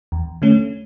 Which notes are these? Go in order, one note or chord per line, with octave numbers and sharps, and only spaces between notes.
E2
D3 A3 C#4